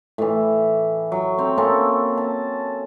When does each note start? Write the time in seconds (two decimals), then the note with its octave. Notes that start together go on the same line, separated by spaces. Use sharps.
0.18 A2 E3
1.12 F#3
1.38 C4 G5 A#5
1.58 A#3 C4 C#4 A4
2.18 A5